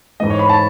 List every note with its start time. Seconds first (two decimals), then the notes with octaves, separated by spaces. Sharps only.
0.20 G#2 E3 A3 D#5
0.30 C#5
0.39 B5
0.49 A5